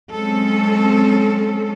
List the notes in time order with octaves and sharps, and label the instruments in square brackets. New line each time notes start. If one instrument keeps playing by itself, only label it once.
[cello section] F#3 G#3 C4 C#4 A4